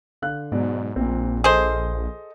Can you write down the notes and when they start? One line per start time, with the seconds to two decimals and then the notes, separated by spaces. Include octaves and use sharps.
0.22 D3 F5 F#6
0.52 G#2 B2 F#3 D5
0.96 A#1 A#2 C4
1.44 G#4 A4 C5 D#5 D#6